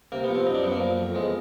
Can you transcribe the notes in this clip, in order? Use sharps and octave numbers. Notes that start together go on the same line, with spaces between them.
C3 A#3
B3
F3
C4
F#2 D#4
D4
F#2 B3
A#3
F3
F2
E2 G#3